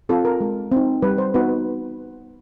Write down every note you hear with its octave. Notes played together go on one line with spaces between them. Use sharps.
C4 F4 A4
A#4
G#3
C4 D#4
G3 B4
C5
B3 D#4 F#4 B4